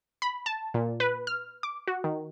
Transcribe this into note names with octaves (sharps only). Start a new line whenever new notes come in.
B5
A5
A#2
B4
F6
D6
F#4
D#3